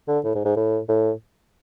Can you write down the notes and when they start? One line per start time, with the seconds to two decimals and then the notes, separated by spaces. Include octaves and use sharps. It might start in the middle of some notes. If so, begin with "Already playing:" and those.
0.08 D3
0.24 A2
0.35 G#2
0.45 G#2
0.56 A2
0.89 A2